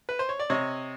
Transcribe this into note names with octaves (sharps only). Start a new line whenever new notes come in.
B4
C5
C#5
D5
C3 C#5 D#5